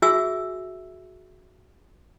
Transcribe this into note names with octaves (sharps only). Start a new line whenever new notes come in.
F#4 G#4 E5 G#5 E6